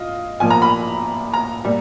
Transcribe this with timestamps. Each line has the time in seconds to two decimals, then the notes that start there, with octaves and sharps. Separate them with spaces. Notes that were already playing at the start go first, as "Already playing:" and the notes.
Already playing: F4 D#5
0.40 A#2 F3 A#3 G#5
0.50 A#5
0.62 B5
1.34 A#5
1.64 A#2 G3